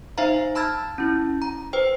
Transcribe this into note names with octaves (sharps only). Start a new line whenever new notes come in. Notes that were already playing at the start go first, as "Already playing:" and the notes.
D#4 C5 E5 F5 A#5
A5 B5 E6 F6 G#6 A6
C#4 E4
A#5
B4 C5 G5